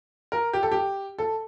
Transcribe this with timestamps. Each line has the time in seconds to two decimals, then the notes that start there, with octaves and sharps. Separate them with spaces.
0.32 A#4
0.53 G4
0.63 A4
0.71 G4
1.18 A4